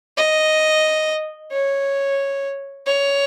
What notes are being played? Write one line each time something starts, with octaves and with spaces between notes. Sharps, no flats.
D#5
C#5
C#5